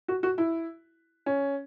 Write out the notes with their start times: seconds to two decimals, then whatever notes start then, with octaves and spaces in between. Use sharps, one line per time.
0.08 F#4
0.23 F#4
0.38 E4
1.26 C#4